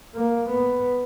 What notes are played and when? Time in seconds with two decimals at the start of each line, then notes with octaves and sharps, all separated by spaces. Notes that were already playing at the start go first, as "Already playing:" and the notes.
0.15 A#3
0.48 B3